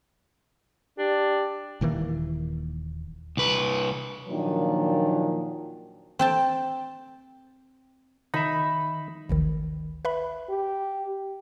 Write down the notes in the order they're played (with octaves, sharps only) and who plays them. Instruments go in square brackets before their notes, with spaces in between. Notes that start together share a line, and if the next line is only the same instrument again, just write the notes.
[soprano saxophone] D4 [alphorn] G4
[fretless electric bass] D#1 D#3 E3 A#3
[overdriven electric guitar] C2 B4
[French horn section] A#2 D#3 F3 F#3 A#3 D4
[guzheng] C4 G5 A5
[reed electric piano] D#3 [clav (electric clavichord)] D#4 E5 [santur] B5
[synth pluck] G#1 D2 D#3
B4 E5 B5
[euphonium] G4